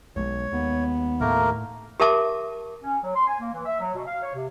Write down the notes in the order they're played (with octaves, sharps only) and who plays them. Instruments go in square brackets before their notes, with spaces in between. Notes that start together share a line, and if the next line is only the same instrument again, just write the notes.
[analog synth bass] B1 [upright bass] G#3 [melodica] C#5
[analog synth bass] D#2 [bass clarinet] B3
[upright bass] A2 [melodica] A3 A#3 A#4
[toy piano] G4 A#4 E5 A5 D6
[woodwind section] C#4
F#3
C6
G#5
A#3
E3
E5
F#3
B2
F5
C#5
C3